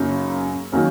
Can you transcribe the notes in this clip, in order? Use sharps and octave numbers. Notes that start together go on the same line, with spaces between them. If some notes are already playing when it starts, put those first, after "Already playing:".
Already playing: F#2 C#3 F#3 A#3 D#4
D#3 F#3 A#3 C#4